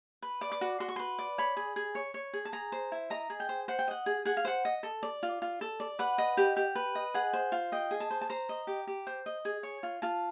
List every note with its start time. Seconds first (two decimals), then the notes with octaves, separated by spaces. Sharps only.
0.22 B4
0.41 D5
0.52 D6
0.61 F#4
0.80 F#4 C6
0.89 C#6
0.96 B4 C6
1.19 D5
1.38 C#5 B5
1.57 G#4
1.76 G#4
1.95 C#5
2.14 C#5
2.33 G#4
2.45 A5
2.53 G#4 A#5
2.72 C5
2.92 E4
3.10 D#5 A#5
3.30 G#4
3.40 G5
3.49 C5
3.68 C5 F#5
3.79 G5
3.88 D#5 F#5
4.06 G#4
4.25 G#4 F#5
4.37 F5
4.45 C5 F#5
4.65 D#5
4.83 A4
5.03 D5
5.23 F4
5.42 F4
5.61 A4
5.80 D5
5.99 B4 F#5
6.18 D#5
6.37 G4
6.57 G4
6.75 B4
6.95 D#5
7.14 G#4 F#5
7.33 C5
7.52 F4
7.72 D#5 G5
7.91 G#4
8.00 A5
8.11 C5
8.21 A5
8.29 C5 A#5
8.49 D#5
8.67 G4
8.87 G4
9.07 C5
9.26 D#5
9.45 G#4
9.63 C#5
9.83 F4
10.02 F4 A5